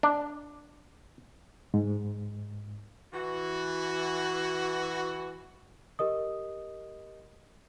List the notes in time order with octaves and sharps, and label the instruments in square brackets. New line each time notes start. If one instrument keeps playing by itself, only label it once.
[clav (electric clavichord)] D4
[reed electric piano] G#2
[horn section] E3 F#4
[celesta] G4 A#4 D#5 D#6